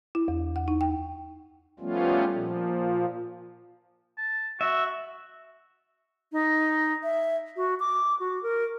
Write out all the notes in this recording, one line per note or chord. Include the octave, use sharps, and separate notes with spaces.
E4
E2
F#5
D#4
G5
F3 G3 A3 B3 C#4 F4
A#2 F3
A5
F#4 E5
D#4
E5
F#4
D6
F#4
A#4